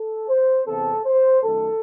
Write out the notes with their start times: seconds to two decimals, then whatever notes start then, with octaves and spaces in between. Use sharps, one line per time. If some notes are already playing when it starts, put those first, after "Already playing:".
Already playing: A4
0.28 C5
0.67 E2 C3 E3 C4 A4
1.06 C5
1.44 F#2 D#3 A3 A4